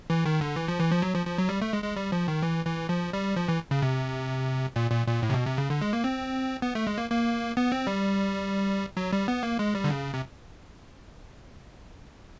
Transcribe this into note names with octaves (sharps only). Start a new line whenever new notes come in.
E3
D#3
D3
E3
F3
E3
F3
F#3
F3
F3
F#3
G3
A3
G#3
G#3
G3
F3
D#3
E3
E3
F3
G3
F3
E3
C#3
C3
A#2
A#2
A#2
A2
C3
B2
C3
C#3
D3
G#3
A#3
C4
B3
A3
G#3
A#3
A#3
B3
C4
G3
F#3
G3
B3
A#3
G#3
G3
D3
C#3
C3